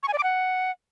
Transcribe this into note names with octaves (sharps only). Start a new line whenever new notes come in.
C#6
G#5
D5
D6
F#5